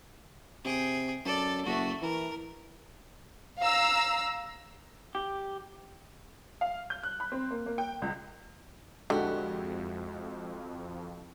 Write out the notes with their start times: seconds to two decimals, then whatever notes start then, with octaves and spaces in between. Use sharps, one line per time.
0.65 C3 G#4 G5
1.25 F#2 A4 D5
1.66 F#1 A3 F#4
2.02 E3 A#4
3.59 F5 A#5 E6
5.15 G4
6.61 F5
6.90 G6
7.03 F#6
7.20 B5
7.32 C4
7.51 A#3
7.66 A#3
7.78 G5
8.02 C#2
9.10 F2 D3 G#3 E4 F#4 G4